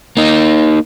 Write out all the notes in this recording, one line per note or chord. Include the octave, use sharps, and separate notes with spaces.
A#3 D#4